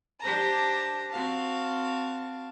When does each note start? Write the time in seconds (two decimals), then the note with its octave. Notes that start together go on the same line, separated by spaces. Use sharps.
0.21 D4 G4 C5 A5 A#5
1.11 C4 F#4 F5 A5